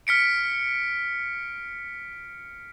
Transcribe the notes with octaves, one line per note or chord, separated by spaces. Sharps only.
F6 B6 C#7 D7